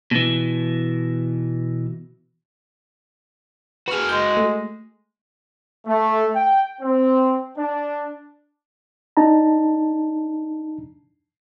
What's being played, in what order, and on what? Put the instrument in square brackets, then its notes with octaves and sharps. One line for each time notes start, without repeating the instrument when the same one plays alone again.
[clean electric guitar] B2 E3
[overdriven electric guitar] F#4 G#4 [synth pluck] B4 F6
[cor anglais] G#3 [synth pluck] G6
[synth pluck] A3
[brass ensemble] A3
G5
C4
D4
[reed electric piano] D4 D#4 A5 A#5